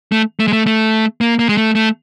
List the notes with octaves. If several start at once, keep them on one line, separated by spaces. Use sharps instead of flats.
A3
A3
G#3
A3
A3
A#3
A#3
G#3
A3
A3